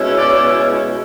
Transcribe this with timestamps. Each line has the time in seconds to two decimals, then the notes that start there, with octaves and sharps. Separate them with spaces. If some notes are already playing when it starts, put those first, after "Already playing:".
Already playing: B2 G#3 C#4 E4
0.17 D5